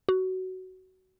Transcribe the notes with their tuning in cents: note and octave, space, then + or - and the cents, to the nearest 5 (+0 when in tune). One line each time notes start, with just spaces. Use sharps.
F#4 +15